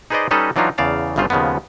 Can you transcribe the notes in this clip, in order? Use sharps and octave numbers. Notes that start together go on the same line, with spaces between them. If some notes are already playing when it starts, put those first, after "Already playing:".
D#4 G#4 B4 C5 D5 D#5
G3 C#4 D#4 A4 B4 D#5
E3 F#3 D4 D#4 F4
E2 C#3 D5 F5 A5
G1 G2 C#3 G3 F4 C5
D#2 C#3 F3 G#3 B3